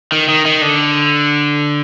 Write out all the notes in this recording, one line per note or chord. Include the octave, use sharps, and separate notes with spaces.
D#3
D#3
D#3
D3